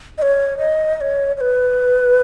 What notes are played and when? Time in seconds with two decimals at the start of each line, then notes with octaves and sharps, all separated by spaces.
0.18 D#5
0.22 C#5
0.58 D#5
0.97 D#5
1.01 C#5
1.37 C#5
1.41 B4